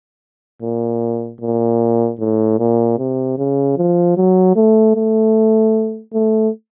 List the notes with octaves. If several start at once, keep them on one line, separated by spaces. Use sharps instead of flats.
A#2
A#2
A2
A#2
C3
C#3
F3
F#3
A3
A3
A3